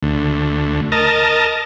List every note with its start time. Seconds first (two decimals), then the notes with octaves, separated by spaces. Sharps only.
0.03 D2
0.92 A#4 D#5 A5